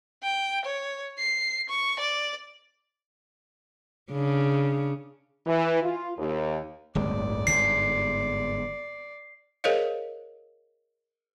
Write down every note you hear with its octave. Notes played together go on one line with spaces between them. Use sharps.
G5
C#5
C7
C#6
D5
C#3 D4
E3
F4
D#2
D1 G1 G#3 D5
G1 G#2 C7
G#4 A#4 C5 C#5 D#5 F5